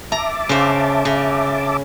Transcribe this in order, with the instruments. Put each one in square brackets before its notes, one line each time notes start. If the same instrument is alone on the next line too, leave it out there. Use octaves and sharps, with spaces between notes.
[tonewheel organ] E5 A5 D6 [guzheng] A#5
[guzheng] C#3 C5
C#3